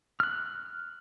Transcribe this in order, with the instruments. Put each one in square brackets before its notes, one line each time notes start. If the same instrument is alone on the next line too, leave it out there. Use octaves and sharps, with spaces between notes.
[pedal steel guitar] F6 F#6